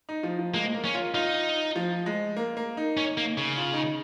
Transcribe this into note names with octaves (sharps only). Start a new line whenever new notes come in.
D#4
F3
F3
G#3 A#3
A#3
C#4
F4
D#4 F4
F3
G#3
A#3
A#3
D#4
C#4
A#3
C#3
F4
D#4